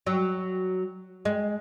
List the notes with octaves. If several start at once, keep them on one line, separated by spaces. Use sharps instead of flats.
F#3
G#3